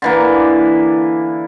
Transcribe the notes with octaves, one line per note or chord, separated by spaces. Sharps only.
D3 E3 A#3